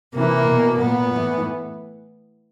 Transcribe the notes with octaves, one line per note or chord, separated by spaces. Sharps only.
C3 E3 A#3
B2
A#2 B3
A2 E3